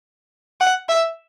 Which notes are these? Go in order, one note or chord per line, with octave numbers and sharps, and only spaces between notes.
F#5
E5